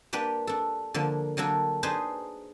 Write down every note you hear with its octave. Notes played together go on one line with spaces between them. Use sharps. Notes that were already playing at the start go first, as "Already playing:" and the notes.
A#3 D4 G4 B4
D4 A4
D3 F3 A#3
D3 F#3 A#3 D4 A4
D4 D#4 G#4 B4 C5